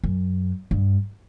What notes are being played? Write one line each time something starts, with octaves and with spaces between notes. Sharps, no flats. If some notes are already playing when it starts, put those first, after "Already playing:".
F#2
G2